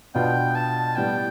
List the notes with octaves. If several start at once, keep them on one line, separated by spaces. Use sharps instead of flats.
B2 B3 D4 F4 G5
A5
A2 G3 B3 G5